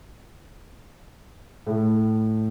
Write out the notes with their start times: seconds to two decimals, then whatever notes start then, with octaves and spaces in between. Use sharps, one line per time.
1.66 A2